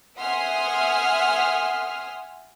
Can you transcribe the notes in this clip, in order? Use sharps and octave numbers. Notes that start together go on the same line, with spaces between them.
E5 F#5 G#5 C6 D#6 F6